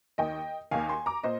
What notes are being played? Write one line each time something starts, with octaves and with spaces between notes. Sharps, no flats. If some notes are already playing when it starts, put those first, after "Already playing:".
D#2 D#3 D#5 G5
D#2 D#3 F5 G#5
G#5 C6
A#5 D6
A#2 C5 D#5